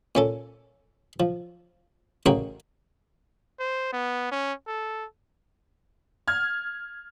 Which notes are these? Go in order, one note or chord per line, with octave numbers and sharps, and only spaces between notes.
A#2 C#4 A4
F3
A1 C#3 F#4 A#4 G5 A#5
C5
B3
C#4
A4
F6 G#6